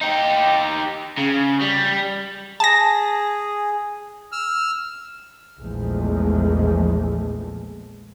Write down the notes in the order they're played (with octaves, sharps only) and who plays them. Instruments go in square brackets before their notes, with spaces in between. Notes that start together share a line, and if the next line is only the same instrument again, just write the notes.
[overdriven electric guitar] D#4 G4
C#3
G3
[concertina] G#4 [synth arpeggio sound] A5 A#6
[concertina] E6 F6
[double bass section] A#1 E2 A#2 F3 G#3 A3